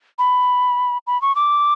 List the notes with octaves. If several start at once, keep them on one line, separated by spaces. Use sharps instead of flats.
B5
B5
C#6
D6